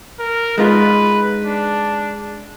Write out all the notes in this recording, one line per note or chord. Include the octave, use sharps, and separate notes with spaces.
A#4
G#3 D#4 F4 B4
D4